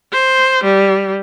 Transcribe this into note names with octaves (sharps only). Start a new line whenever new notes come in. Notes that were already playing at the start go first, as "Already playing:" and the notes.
C5
G3